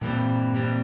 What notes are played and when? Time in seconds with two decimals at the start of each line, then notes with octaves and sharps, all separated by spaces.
0.01 G2 A#2 E3 G3 C4
0.53 G2 E3 G3 C4